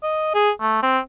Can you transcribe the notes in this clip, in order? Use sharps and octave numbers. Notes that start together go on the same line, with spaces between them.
D#5
G#4
A3
C4